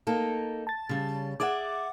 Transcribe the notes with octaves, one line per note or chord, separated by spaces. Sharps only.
A#3 D#4 A4
A5 A6
C#3 G3
G#4 D5 E5 F#5 D6